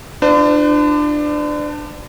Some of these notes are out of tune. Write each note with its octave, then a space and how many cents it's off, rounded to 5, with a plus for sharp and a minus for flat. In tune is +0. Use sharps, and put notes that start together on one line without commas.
D4 +20 F4 -35 C5 -45